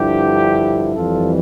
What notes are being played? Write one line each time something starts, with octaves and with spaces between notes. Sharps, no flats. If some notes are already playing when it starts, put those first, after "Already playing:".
Already playing: G2 D3 F3 E4 G4
F2 E3 G3 F4 A4